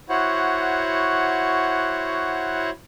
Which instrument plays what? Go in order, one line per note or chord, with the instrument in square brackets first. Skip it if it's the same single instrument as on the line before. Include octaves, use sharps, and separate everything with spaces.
[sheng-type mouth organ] E4 F#4 C5 C#5 F#5